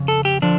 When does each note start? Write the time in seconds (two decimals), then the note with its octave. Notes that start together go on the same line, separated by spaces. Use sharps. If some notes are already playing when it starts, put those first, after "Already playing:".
Already playing: F2 C#3
0.08 A4
0.25 G4
0.42 D3 F3 D4